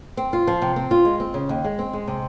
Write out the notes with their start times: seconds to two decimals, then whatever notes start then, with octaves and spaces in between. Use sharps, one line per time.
0.17 C4
0.33 F4
0.47 F3
0.62 C3
0.76 C4
0.91 F4
1.05 G#3
1.20 C4
1.34 C#3
1.49 D#2
1.64 G#3
1.79 C4
1.93 G#3
2.08 C3